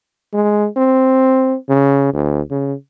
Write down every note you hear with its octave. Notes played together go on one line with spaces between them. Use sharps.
G#3
C4
C#3
D2
C#3